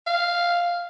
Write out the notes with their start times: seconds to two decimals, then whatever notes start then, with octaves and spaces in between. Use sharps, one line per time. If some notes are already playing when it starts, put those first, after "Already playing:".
0.07 F5